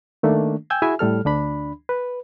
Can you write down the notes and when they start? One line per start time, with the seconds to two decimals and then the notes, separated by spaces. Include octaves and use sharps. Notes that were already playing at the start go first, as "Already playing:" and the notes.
0.23 D#3 A3 A#3 D4
0.70 G5 G#5 E6 G6 G#6
0.82 E4 F#4 G#4 E5 G#5
0.99 A2 G3 A4 F6
1.25 D2 D4 B5
1.89 B4